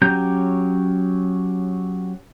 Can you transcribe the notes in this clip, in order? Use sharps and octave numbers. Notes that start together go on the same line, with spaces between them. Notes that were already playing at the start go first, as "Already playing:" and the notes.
F#3 C#4 G4 A#5 G6